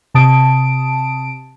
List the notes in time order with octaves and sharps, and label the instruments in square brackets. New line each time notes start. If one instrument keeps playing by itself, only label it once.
[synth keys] C3 A5 D#6 D7